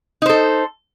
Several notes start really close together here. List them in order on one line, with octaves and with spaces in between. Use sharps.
D#4 C5 A4